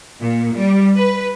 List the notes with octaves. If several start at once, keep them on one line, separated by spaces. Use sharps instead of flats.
A#2
G3
B4